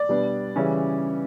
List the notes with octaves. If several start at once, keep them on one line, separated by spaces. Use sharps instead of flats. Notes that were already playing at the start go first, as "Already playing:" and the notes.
Already playing: D5
B2 G3 B3 D4
C#3 E3 G3 C#4